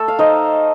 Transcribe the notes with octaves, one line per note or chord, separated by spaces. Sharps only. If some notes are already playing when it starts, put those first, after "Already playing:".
Already playing: A3 A4
F5
D#4 C5 D#5